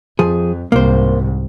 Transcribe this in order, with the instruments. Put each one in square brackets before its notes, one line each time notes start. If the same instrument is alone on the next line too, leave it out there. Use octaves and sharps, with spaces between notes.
[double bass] F2 [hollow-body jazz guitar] F3 G#4
[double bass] C2 G#2 [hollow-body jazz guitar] A#3 C5